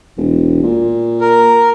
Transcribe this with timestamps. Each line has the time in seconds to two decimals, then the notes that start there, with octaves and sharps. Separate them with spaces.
0.17 E1
0.63 A#2
1.21 A#4